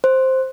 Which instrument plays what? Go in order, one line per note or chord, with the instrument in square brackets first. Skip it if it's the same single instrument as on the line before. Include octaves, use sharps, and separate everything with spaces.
[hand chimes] C5